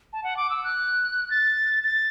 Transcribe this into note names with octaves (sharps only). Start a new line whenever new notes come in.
A5
F#5
D6
E6
F#6
A6
A6